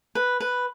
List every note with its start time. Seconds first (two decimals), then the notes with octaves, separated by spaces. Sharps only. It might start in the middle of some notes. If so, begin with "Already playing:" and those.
0.15 B4
0.40 B4